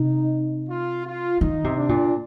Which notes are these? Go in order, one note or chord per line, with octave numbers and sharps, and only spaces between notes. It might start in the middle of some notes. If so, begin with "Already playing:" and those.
Already playing: C3 D#4
F4
F4
D#3 D#4
C3
D4
A#2